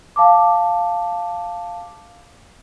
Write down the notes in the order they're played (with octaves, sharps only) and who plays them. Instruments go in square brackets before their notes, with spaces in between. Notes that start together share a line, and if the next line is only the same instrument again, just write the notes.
[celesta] F5 A5 D6